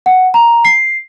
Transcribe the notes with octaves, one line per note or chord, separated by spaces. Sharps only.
F#5
A#5
C7